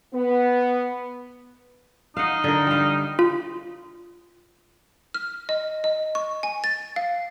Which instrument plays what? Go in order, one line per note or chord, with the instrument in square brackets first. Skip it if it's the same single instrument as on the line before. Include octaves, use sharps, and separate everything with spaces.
[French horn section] B3
[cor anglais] D#4 [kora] F5 F#5
[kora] D3 A#4
G3 F5
[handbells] F4
[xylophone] F6
D#5
D#5
C#6
G#5
A6
F5